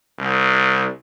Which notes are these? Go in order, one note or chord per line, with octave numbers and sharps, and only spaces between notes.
C2